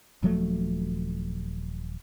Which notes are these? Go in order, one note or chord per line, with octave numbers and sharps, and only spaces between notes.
D#1 F3 F#3 A3